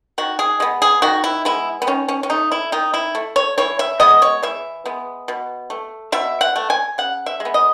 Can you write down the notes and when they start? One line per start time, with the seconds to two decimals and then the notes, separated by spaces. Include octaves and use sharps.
0.18 D#3 F#4
0.39 G#4
0.60 G#3 B3
0.82 G#4
1.02 D#3 F#4
1.24 E4
1.45 G#3 B3 E4
1.82 B3
1.87 D#3 C#4
2.09 C#4
2.23 C#4
2.30 A3 D#4
2.52 E4
2.72 D#3 D#4
2.94 E4
3.15 A3
3.36 C#5
3.58 E3 C#5
3.79 E5
4.00 G#3 B3 D#5
4.22 C#5
4.43 E3 E5
4.85 G#3 B3
5.28 B2
5.70 A3
6.12 B2 E5
6.41 F#5
6.56 A3
6.70 G#5
6.98 C#3 F#5
7.26 E5
7.40 G#3
7.45 B3
7.54 D#5